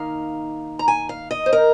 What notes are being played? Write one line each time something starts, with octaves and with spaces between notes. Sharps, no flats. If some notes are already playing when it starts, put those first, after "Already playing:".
Already playing: D#3 A#3 D#4 F5
A#5
G#5
F5
D#5
C5
A#4